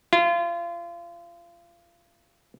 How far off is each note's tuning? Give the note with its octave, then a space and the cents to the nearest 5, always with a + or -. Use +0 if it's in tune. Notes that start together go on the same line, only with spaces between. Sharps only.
F4 -30